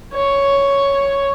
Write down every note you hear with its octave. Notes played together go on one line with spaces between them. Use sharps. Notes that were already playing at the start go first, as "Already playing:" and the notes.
C#5